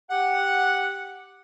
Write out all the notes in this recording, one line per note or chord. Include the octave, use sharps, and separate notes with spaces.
G4 F#5